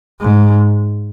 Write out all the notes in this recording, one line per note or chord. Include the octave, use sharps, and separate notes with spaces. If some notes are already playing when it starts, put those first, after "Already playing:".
G#2